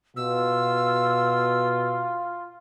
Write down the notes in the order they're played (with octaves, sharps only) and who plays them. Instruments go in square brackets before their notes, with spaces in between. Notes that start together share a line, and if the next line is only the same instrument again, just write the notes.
[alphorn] B2 [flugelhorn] F4 [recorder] E6